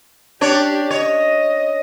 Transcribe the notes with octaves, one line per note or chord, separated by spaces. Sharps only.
D4 G4 C#5
C#5 D#5